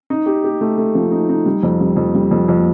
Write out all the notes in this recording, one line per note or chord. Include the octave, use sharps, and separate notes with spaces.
D#4
G4
G4
A3
A3
F3
D#4
D#4
G3
F2
G3
F2
G3
F2
F2